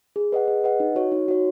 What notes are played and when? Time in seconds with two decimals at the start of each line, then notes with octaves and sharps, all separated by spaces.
0.16 G#4
0.32 B4 D#5 F#5
0.48 G#4
0.64 B4 D#5 F#5
0.80 D#4
0.95 F#4 C#5
1.12 D#4
1.28 F#4 C#5